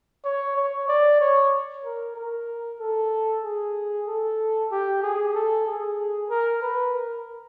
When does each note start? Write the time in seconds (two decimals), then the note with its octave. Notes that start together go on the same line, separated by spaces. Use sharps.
0.24 C#5
0.57 C#5
0.88 D5
1.21 C#5
1.85 A#4
2.16 A#4
2.80 A4
3.44 G#4
4.07 A4
4.71 G4
5.02 G#4
5.35 A4
5.67 G#4
6.30 A#4
6.62 B4
6.94 A#4